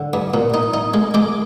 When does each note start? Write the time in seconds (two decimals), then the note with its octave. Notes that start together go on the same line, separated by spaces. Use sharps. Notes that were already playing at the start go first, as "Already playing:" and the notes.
Already playing: D3
0.13 G2
0.34 A#2
0.54 D#4
0.74 D#4
0.94 G#3
1.14 G#3 D6